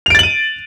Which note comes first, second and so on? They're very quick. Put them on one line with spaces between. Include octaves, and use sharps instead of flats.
F7 D7 A6 F#7 D#7